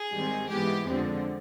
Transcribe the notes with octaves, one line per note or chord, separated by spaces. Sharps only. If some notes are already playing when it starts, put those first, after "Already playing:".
Already playing: G#4
G#2 D#3 G3 C4
G#2 E3 G#3 B3 G4
F2 D3 F3 G#3 C4